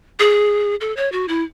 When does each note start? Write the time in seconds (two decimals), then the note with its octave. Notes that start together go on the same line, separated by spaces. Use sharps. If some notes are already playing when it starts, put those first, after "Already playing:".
0.19 G#4
0.81 A4
0.97 C#5
1.12 F#4
1.28 E4